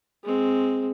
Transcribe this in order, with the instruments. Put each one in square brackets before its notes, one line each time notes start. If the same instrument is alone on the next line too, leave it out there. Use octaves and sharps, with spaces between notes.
[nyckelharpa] G#3 C4